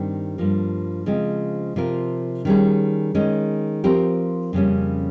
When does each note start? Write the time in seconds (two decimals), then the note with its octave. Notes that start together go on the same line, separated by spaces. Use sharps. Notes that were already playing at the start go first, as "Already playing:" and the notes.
Already playing: G2 D#3 G3 C4
0.38 G2 F3 A#3
1.06 C#3 F3 G#3 C4
1.76 C3 F3 C4 F4 A#4
2.45 D#3 G3 C#4 G#4
3.15 D#3 G#3 C#4
3.84 F3 C4 G4 A#4
4.53 F2 C#3 G3 A#3 C#4